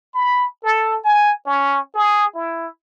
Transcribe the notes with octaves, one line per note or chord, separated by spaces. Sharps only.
B5
A4
G#5
C#4
G#4
E4